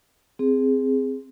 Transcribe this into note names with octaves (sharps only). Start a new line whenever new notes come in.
C4 G#4